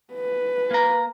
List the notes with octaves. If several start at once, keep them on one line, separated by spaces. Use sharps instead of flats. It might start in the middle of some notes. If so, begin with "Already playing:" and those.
B4
A#3 A#5